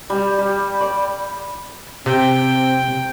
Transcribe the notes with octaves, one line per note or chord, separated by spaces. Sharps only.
G3
G3
D5
C3 C4 G5